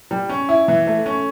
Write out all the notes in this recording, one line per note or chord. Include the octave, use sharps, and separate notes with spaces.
G3
C#4
E4
E3
A3
C#4